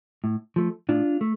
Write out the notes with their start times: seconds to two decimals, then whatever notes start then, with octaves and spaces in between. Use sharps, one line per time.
0.24 A2
0.56 F3 A3
0.89 A2 D4 F4
1.21 A3